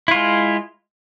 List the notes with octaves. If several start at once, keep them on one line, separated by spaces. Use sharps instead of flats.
G#3 E4 F4